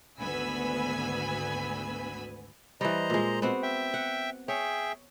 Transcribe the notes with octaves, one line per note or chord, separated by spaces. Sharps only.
G#1 D2 B3 G#5 B5 E6
E3 G3 C5 D#5 A#5
A#2 G#3
B3 C4 F#4
E5 G5
F#5
G#4 C#5 E5 G5